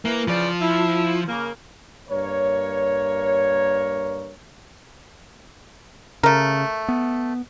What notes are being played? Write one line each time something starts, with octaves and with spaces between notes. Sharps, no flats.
E3 A#3
C#3 E3 F3 D5
E4
C#3 A#3
G2 A#3 A#4 C#5
C#3 A3 A#4
B3